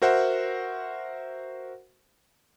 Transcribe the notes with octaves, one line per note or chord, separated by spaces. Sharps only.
F#4 A#4 C5 E5 F#5